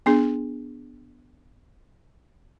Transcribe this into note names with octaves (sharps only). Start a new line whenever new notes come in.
B3 D4 G#4